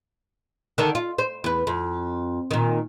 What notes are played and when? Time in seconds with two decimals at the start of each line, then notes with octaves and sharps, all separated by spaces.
0.78 D3 D#3 A4
0.95 F4
1.18 C5
1.44 E2 B4
1.67 F2
2.51 A#2 D#3